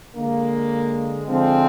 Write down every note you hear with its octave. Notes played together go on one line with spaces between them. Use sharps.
D3 G#3 A#3
D3 F3 G#3 C4